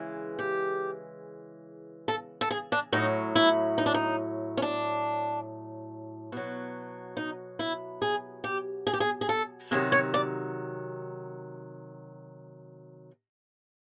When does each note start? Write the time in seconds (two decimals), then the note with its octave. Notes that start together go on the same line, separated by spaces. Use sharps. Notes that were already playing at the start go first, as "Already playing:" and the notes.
Already playing: C#3 E3 G#3
0.39 G4
2.08 A4
2.41 A4
2.51 G#4
2.72 D4
2.92 A2 F#3 D#4
3.36 E4
3.78 D#4
3.86 D4
3.94 D#4
4.57 C#4
4.62 D4
6.32 B2 F#3
7.17 D#4
7.59 E4
8.02 G#4
8.44 G4
8.87 G#4
8.94 G4
9.00 G#4
9.21 G#4
9.29 A4
9.71 C3 D#3 F#3 G#4
9.92 C#5
10.14 D5